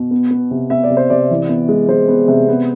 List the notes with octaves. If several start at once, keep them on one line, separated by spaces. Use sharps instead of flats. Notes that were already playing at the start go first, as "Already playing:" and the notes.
Already playing: B2
B3
B3
C3
B3 E5
D5
C3
C5
C3 D5
E3
B3
G#3
G#3 C5
B3
C3
B3